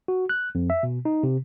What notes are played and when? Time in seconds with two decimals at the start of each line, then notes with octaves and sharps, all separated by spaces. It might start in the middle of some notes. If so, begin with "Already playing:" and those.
0.08 F#4
0.29 F#6
0.55 F2
0.70 E5
0.83 B2
1.05 D#4
1.23 C3